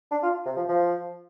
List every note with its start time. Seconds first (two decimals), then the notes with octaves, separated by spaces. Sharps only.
0.11 D4
0.23 F4
0.46 C3
0.57 F3
0.69 F3